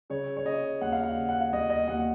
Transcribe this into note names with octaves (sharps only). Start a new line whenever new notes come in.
C#3 C#5
C#5
C#3 D#5
D#2 F#5
F5
F#5
C#3
F#5
F5
D#2 D#5
D#5
D#2 F#5